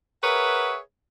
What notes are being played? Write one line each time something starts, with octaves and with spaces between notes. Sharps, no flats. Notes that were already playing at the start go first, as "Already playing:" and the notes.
G#4 A#4 B4 C#5 E5 F#5